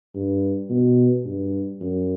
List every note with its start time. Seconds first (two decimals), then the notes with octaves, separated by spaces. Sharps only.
0.15 G2
0.70 B2
1.25 G2
1.81 F#2